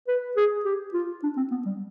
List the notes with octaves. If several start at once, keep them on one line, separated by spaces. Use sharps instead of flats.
B4
G#4
G4
F4
D4
C4
B3
G3